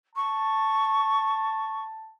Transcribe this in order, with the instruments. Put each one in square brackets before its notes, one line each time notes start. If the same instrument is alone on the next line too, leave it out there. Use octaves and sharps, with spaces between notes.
[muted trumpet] A5 [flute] C#6